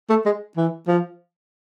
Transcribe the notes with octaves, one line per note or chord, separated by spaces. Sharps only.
A3
G#3
E3
F3